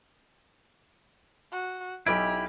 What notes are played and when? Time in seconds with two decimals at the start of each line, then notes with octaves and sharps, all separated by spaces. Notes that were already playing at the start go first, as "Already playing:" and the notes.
1.52 F#4
2.06 B1 E4 G4 D#5 B5 D7